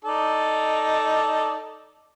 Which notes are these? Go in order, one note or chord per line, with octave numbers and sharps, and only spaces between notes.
D#4 A4 D5